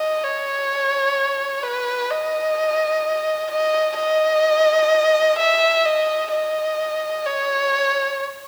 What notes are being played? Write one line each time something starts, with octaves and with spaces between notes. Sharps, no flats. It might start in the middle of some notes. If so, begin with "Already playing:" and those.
Already playing: D#5
C#5
B4
D#5
D#5
D#5
E5
D#5
D#5
C#5